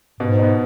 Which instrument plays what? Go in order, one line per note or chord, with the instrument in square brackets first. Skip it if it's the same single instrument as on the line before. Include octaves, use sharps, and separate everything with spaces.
[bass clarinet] G#2 [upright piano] B2
[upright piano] B3 D#4